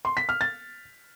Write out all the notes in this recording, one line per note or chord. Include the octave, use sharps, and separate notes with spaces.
C6
B6
F6
A6